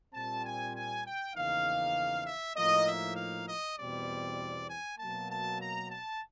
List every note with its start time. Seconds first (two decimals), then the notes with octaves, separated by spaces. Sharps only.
0.14 A#2 G3 C4 A5
0.44 G#5
0.74 G#5
1.05 G5
1.35 E2 C#3 F3 A#3 D#4 F5
2.27 E5
2.57 A2 F3 A#3 D#4 D#5
2.86 E5
3.17 F5
3.47 D#5
3.78 E2 B2 G3 C4 D5
4.69 G#5
4.99 B2 F#3 A#3 A5
5.29 A5
5.60 A#5
5.90 A5